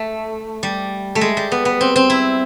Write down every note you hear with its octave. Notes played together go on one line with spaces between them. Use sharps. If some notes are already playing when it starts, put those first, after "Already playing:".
Already playing: A3
G3
A3
G#3
G3
B3
B3
C4
C4
E4